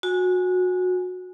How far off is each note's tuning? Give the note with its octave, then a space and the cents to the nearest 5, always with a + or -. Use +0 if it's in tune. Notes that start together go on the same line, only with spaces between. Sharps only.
F#4 -25 G#5 +0